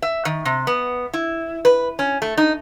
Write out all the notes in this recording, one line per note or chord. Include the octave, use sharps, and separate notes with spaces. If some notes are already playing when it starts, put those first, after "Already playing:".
E5
D#3
C3
B3
E4
B4
C#4
A3
D#4